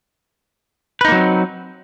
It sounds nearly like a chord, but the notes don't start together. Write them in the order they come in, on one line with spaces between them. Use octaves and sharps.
B4 D#4 A#3 F#3 C4